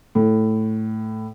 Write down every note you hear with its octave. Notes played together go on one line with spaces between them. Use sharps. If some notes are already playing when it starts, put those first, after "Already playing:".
A2